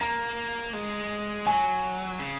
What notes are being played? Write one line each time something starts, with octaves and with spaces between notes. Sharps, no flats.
A#3 A#5
G#3
F#3 G#5
C#3